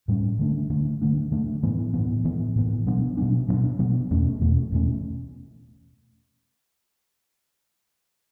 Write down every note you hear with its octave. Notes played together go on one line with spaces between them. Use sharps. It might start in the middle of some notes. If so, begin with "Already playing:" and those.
A2 G3 C#4
D3 A3 D4
D3 A3 D4
D3 A3 D4
D3 A3 D4
A2 E3 B3
A2 E3 B3
A2 E3 B3
A2 E3 B3
B2 F#3 B3 D4
B2 F#3 B3 D4
B2 F#3 B3 D4
B2 F#3 B3 D4
E2 B2 A3 C#4
E2 B2 A3 C#4
E2 B2 A3 C#4